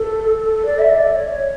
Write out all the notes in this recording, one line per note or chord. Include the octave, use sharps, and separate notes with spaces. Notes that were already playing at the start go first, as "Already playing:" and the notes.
Already playing: A4
A4
D5
E5
D5
C#5